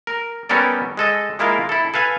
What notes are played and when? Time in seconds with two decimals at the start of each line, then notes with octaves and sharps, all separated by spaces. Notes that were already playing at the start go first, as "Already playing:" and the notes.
0.07 A#4
0.49 G3 B3 C#4 A4 A#4 D5
0.97 G#3 A4 D#5
1.39 G#3 A#3 E4 F4 A#4 F5
1.69 E4 A4
1.94 A4 B4 F5 G#5